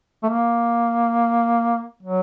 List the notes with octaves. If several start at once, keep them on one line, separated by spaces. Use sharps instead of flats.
A3
A#3
F#3